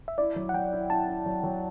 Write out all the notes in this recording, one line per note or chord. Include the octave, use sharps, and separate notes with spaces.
E5
E4 D5
F#3
F#5
F#3 G5
E4
E4 A5
E4
F#3
F#3